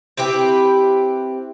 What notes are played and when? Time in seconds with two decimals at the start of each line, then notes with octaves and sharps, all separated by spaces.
0.17 C4 E4 G4 B4